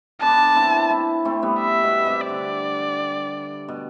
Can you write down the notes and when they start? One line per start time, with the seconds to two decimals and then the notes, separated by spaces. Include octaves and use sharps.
0.22 B3 D4 A5
0.56 C4 E4
0.90 C4 E4
1.25 A3 C4
1.43 G3 B3
1.60 E5
1.83 B2
2.06 C3
2.29 D3 D5
3.68 B2